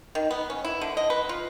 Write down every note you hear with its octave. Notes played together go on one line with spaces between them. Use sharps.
D#3
B3
C#4
E4
D3
D#5
B4
F4